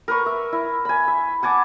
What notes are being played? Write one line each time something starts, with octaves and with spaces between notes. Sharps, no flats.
A#4 B4 C#6
E5
E4
G#5 B5
E5
F#5 G#5 A5 D6